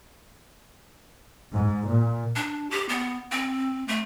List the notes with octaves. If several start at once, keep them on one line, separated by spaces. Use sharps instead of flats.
G#2
A#2
D4
G4
B3
C4
A3